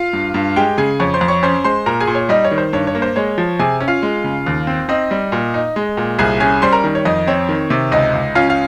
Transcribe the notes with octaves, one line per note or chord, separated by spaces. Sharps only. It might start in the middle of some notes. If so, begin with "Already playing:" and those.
Already playing: F4 F5
G2
G2
G#3 G4 G5
C#3 G#4 G#5
F2 C#5 C#6
C5 C6
F2
C#5 C#6
C#4 C5 C6
G#3 C5 C6
A#2 A#4 A#5
G#4 G#5
A#2
C#5
G3 D#4 D#5
C#5
D#3
C5
G2 C#5
C#5
A#3
C5
G#3 C#5
F3
C3 G#4 G#5
C#4
F4 F5
G#3
C#3
D#2
C4
C4 D#4 D#5
G3
A#2
D#4
G#3
A#2
C2 G#4 G#5
C#4 G#4 G#5
G3 C5 C6
A#4 A#5
D#3
C#5
F2 D#4 D#5
C4 C#5
D#3
C3
C#2 D#4 D#5
C#2
C#4 F4 F5
F4 F5